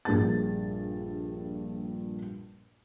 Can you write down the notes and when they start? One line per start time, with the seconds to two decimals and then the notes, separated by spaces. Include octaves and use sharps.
0.05 A#1 G2 A#3 G#4 A6